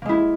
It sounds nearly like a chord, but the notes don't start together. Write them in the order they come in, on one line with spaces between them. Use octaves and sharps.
A#3 G#3 E4